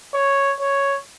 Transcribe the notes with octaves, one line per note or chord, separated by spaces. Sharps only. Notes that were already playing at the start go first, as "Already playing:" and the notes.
C#5
C#5